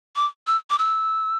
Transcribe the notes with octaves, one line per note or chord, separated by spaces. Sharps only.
D6
E6
D6
E6